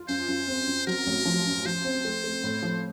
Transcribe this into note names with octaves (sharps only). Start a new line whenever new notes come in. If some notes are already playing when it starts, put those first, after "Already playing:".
Already playing: F4
F#2 C5
F#2
C4
F#2
F#3 A#4
A1
F3
F#2
F3 C5
C4
A3
A3
A2
F3